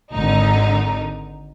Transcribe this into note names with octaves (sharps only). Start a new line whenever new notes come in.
G#1 D3 D#4